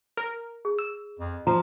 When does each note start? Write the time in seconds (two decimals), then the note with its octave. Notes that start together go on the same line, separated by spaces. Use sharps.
0.17 A#4
0.65 G#4
0.79 E6
1.19 F2
1.47 F3 F4 A#5